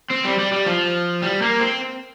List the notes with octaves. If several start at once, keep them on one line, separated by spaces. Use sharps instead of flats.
C4
G3
G3
G3
F3
G3
A#3
C4